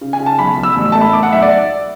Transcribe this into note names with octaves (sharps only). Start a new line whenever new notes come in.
C#3
G#5
C#3
A5
B1 B5
B1
E6
A1
A3 A5
B5
A3 D6
F#5
B1 E5
D5